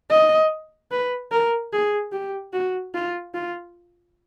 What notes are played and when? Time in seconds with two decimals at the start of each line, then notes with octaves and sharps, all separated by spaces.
0.10 D#5
0.91 B4
1.31 A#4
1.73 G#4
2.12 G4
2.53 F#4
2.94 F4
3.35 F4